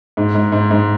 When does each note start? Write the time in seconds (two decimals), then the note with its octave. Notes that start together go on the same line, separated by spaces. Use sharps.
0.17 G#2
0.35 G#2
0.52 G#2
0.71 G#2